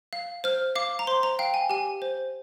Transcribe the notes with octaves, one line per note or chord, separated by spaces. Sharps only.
F5
C5 F6
F5 D6
A#5
C5 C6
A#5
F5 G5
G#5
G4 G#5
C5